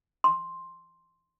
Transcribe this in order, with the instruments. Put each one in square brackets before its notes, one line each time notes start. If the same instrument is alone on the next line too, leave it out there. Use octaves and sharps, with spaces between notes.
[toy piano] C6